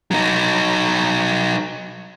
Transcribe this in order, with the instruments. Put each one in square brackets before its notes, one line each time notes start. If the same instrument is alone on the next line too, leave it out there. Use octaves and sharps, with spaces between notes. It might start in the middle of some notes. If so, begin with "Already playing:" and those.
[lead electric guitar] F#3 D#4